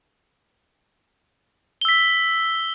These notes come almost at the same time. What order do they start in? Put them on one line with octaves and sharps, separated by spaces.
G7 E6 B6